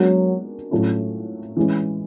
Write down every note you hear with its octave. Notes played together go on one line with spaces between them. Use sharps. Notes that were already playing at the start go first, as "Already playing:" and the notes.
Already playing: F#3 G#3 B3 D4 F#4 A#4
A2 F#3 A3 C#4 F4
E3 G#3 C#4